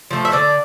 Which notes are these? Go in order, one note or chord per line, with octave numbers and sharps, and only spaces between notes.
F3 A3
E5
D3 D5